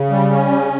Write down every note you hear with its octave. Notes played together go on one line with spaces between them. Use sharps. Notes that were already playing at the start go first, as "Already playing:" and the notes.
Already playing: C#3
G3
C#4
C#3